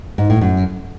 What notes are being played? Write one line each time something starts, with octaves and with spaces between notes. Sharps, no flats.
G#2
A2
F#2